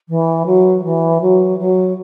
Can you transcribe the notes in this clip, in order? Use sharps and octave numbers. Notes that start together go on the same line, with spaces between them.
E3
F#3
E3
F#3
F#3